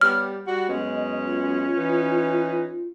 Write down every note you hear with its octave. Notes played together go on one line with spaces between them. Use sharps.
G3 B3 G4 C#5 F6
G3 F#4
F#2 G#3 B3 C#4 D#5
F4
E3 D#4 B4